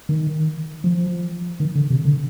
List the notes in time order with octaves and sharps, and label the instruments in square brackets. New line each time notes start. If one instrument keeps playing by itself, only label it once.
[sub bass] D#3
F3
D#3
D3
C3
D3